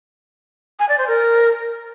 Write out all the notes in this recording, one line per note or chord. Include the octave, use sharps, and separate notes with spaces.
G#5
D5
C5
A#4